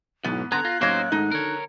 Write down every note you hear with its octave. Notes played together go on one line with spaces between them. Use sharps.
B1 G#2 E3 B3
D3 B3 A4 A#5 C6 F#6 G#6
F4 A#6
A1 F#3 A#3 C#4 D#4 C5 C#5
G#2 D#3 A3 D#4
D3 A4 A#4 C#5